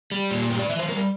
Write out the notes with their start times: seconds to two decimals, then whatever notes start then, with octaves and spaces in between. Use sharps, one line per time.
0.12 G3
0.31 A#2
0.50 G2 G4
0.59 D5
0.69 E3 E5
0.79 C5
0.88 G3 A#4